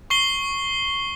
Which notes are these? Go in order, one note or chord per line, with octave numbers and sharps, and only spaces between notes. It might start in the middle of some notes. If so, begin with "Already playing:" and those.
C#6 C7 G7